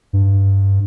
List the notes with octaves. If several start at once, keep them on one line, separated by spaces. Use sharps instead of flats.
G2